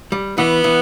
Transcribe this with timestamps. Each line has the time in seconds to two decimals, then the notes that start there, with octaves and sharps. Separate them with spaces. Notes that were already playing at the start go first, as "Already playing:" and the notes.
0.12 G3
0.38 E3 B3
0.64 E3